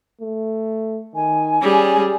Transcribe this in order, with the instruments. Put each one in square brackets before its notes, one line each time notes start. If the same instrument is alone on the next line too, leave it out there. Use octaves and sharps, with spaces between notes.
[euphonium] A3
[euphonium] D#3 [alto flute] G#5
[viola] G3 G#4 [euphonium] C#4